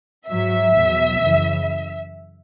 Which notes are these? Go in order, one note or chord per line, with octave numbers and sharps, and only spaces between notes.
G#2 F#3 E5
E2 B2 F#3
F#2 C#3 E3